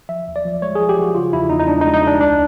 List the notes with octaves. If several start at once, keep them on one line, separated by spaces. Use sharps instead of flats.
F3 E5
D#2
D5
F3
G#3 C#5
F3 G#4
G4
F3 F#4
C#3 F4
E2 E4
E2 D#4
D#4
G#3 D4
D#4
G#3
D#4
G#3
D4
C#2 D4